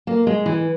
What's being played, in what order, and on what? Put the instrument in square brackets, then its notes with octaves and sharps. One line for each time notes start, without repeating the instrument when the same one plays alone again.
[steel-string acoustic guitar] A#3
G#3
E3